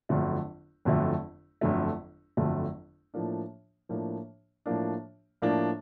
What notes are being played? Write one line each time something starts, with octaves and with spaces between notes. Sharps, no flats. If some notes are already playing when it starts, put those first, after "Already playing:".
G1 F2 D3 F#3 A3
G1 F2 D3 F#3 A3
G1 F2 D3 F#3 A3
G1 F2 D3 F#3 A3
A2 F3 A#3 D4
A2 F3 A#3 D4
A2 F3 A#3 D4
A2 F3 A#3 D4